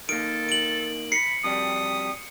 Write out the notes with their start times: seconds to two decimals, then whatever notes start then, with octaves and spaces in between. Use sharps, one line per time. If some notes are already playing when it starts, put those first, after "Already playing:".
0.09 D#3 A#3 A4 D7
0.49 D7 F#7
1.12 B5 C7 C#7
1.44 F2 G3 D#6